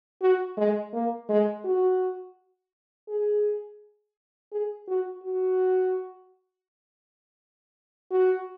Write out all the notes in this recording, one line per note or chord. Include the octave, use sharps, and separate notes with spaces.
F#4
G#3
A#3
G#3
F#4
G#4
G#4
F#4
F#4
F#4